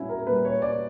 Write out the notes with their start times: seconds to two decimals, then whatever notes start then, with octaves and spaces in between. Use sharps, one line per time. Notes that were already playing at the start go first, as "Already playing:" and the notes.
Already playing: A#2 G3 C#4 E4 F#4
0.09 A#4
0.27 A#2 B4
0.30 G3
0.45 C#5
0.62 D5